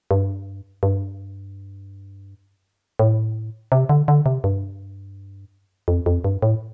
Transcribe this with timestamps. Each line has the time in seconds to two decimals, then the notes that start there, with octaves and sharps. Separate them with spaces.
0.11 G2
0.83 G2
2.99 A2
3.72 C3
3.89 D3
4.08 D3
4.26 C3
4.44 G2
5.88 F2
6.06 F2
6.24 G2
6.42 A2